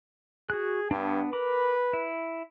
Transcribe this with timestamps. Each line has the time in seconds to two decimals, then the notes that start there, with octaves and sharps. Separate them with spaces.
0.50 F#4 G#4 F#6
0.91 G2 B3 D4
1.33 A#4 B4 B5 D6
1.93 E4